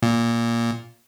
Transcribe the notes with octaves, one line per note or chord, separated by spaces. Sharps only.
A#2